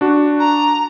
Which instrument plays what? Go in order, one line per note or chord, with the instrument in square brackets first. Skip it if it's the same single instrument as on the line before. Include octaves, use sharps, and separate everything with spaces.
[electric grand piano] D4 F#4
[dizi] A#5